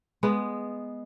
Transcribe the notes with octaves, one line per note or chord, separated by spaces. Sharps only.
G#3 B3